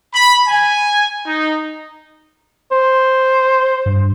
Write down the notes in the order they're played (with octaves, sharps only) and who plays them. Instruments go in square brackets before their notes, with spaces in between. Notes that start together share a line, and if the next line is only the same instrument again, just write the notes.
[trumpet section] B5
G#5
D#4
[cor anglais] C5
[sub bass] G2